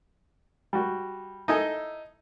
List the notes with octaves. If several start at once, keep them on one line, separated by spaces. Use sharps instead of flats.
G3 F#4
D#4 E4 A4 D#5 G#5